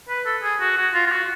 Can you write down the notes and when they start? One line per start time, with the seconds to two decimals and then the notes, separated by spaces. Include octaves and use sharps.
0.09 B4
0.26 A4
0.43 G#4
0.60 F#4
0.77 F#4
0.94 F4
1.07 F4
1.12 F#4